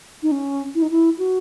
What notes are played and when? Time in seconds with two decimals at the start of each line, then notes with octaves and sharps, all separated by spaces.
0.23 D#4
0.32 C#4
0.75 E4
0.82 D#4
0.90 E4
1.19 F#4